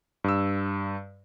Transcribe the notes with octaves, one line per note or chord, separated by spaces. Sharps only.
G2 E6